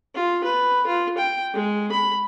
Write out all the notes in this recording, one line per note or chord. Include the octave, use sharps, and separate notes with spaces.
F4
B4
F4
G5
G#3
B5